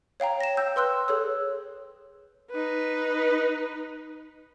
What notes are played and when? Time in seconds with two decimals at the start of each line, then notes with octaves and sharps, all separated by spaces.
0.20 C#5 F5 G5 A#5
0.41 A#6 E7
0.57 G5 E6 G6
0.76 B4 C6 E6 F#6
1.08 G#4 A4 C#5 E6
2.51 D#4 B4